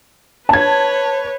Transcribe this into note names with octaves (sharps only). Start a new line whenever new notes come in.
B4 C#5 A5 G#6